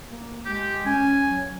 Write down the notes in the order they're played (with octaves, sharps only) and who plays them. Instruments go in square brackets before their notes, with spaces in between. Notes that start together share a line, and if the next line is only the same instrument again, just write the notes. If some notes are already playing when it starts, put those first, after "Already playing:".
[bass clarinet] A#3
[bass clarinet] G#3 [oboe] G4
[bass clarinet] C#4 [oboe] G#5
[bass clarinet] F#3